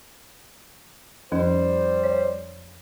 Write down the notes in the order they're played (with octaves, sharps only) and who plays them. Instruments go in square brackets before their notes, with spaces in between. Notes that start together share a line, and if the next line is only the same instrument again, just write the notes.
[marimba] F2 F3 C#4 [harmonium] G3 C5
[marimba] C#5 D5